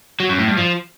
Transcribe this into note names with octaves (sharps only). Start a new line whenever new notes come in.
F#3
F#2
A2
G2
F3